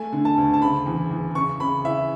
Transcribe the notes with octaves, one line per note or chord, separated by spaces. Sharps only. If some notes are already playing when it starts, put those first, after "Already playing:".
Already playing: A3 G#5
D3
A5
D2
A5
C#3 B5
E2
E2
C#3 C#6
C#3 B5
E3 E5